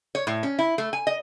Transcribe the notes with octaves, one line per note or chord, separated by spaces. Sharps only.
C#5
A2
C#4
E4
A3
G#5
D#5